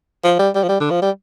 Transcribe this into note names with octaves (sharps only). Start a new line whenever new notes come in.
F3
G3
G3
F3
G3
D3
F3
G3